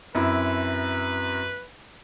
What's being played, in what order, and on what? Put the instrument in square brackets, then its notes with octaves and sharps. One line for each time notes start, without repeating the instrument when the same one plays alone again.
[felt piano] F#2 C4 E4 [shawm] B4